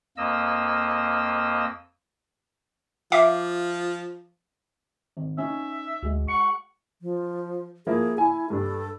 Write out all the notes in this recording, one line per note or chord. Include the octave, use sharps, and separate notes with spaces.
F2 A#3 D#5 E6
F3 E5 F5 D6
G#1
C#4 D#4 E5
D2 G#3 F#4
F#5 C#6
F3
F3 A#3 E4 G#4
E4 G#5
G2 D4 A4